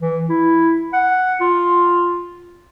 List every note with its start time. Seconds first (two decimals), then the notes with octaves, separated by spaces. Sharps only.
0.01 E3
0.30 E4
0.93 F#5
1.41 F4